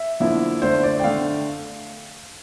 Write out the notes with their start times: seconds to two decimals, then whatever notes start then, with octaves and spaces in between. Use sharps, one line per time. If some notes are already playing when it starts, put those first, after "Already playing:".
Already playing: E5
0.20 D3 F3 A#3 E4
0.62 D3 A3 D4 C5
0.83 D5
1.00 G5
1.04 D3 A3 D4 F5